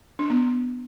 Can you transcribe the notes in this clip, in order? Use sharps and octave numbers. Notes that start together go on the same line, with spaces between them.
D4
B3